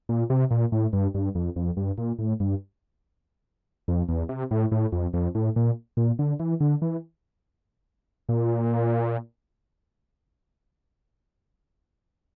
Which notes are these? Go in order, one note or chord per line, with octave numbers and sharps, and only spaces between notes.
A#2
C3
A#2
A2
G2
G2
F2
F2
G2
A#2
A2
G2
F2
E2
C3
A2
A2
F2
F2
A2
A#2
A#2
D3
E3
D3
E3
A#2